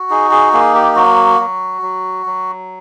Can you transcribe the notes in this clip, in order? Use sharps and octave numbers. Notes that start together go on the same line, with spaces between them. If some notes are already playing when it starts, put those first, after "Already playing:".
Already playing: F#4
D#4 G#4
G#4
A#3 G#4
G4
F#3 F#4
F#3
F#3
F#3